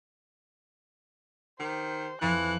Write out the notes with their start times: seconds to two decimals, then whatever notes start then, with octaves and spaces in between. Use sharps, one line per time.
1.60 D#3 G4 C5
2.22 F2 E3 F3 F#6